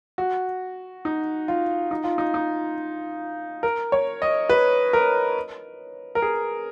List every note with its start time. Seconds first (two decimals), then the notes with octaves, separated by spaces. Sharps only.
0.18 F#4
1.05 D#4
1.48 F4
1.91 D#4
2.04 F4
2.18 D#4
2.34 D#4
3.63 A#4
3.92 C#5
4.22 D#5
4.49 B4
4.93 A#4
6.15 A#4
6.22 G#4